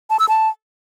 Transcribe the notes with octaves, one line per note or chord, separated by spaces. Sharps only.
A5
E6
A5